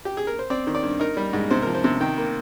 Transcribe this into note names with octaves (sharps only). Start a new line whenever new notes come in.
G4
G#4
A#4
C5
C4 D5
D#3
D5
G2
D#4 A#4
G3
G#2
C3 C5
F3 A#4
C5
C3
D#3 G5
A#3